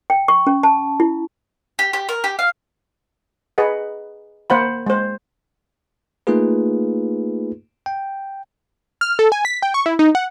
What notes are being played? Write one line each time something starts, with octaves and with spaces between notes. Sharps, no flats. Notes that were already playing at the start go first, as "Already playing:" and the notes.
G5
C#6
C#4
A5
E4
G4
G4
A#4
G4
F5
G#4 B4 D#5 F#5
A#3 C5 F#5 B5
G#3 C5
A3 A#3 D#4 F4 G#4 B4
G5
F6
A4
G#5
B6
G5
C#6
E4
D#4
F#5